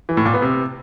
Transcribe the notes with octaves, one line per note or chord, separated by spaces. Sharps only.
E3
A2
A#2
B3
C3